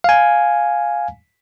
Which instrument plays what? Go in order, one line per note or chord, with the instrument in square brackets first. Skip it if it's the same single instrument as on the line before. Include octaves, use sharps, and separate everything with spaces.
[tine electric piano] F5 G#5